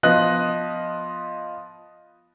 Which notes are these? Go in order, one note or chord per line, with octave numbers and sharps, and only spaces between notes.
F3 B3 D#5 F#6 F#7